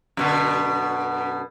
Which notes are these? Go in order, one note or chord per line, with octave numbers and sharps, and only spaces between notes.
F#2 B2 D3